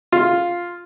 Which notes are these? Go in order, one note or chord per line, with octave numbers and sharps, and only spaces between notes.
F4